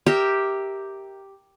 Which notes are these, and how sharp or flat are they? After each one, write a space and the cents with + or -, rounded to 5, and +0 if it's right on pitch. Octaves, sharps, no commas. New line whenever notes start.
G4 +0 A#4 +0 E5 -15